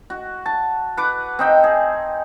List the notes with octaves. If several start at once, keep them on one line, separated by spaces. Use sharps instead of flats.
F#4
A5
B4 F#5 D6
C4 D#4 G5
G#4